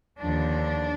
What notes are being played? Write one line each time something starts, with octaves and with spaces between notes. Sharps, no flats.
D#2 D3 F3 D4